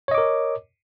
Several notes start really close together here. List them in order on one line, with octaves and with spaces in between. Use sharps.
C#5 D#5 D6 A#4